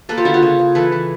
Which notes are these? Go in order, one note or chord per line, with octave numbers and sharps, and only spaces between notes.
A#3 A4 B4
F4 G4
D3 E4 F#4
F4 G4
C#3
C#3
E3 A4 B4
E3